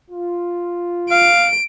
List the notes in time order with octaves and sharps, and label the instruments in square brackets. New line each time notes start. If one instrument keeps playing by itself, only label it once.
[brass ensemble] F4
[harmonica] F5 [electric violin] D7